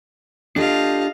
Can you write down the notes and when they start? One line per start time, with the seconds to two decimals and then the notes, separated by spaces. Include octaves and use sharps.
0.56 D4 F4 G4 A4 D#5 F5